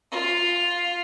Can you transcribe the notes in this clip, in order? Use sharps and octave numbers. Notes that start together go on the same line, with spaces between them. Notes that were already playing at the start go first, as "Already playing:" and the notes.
F4